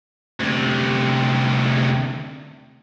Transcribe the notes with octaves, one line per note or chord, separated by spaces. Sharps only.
D2 C3